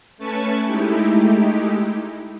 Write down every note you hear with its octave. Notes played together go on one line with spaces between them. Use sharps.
A3 C#4 B4 A5 C#6
G#3 A3 D#4 E4 G4